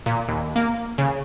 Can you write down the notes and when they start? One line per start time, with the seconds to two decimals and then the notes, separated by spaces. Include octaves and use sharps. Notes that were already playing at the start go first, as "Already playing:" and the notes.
0.06 A#2
0.28 D#2
0.56 A#3
0.98 C#3